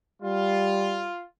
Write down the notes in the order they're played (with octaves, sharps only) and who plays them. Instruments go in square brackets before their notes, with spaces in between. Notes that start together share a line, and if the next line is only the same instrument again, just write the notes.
[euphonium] G3 [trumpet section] F4